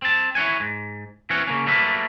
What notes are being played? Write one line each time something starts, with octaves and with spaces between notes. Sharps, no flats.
C4 A5
E4 C#5 F#5 G#5
G#2
E3 C4 C#4 F#5
C#3 A#3 C#4
F#3 G3 A3 A#3 B4 E5